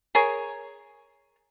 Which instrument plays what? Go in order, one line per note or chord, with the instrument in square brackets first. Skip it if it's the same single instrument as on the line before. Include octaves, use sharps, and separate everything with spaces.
[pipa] G#4 A#4 C#5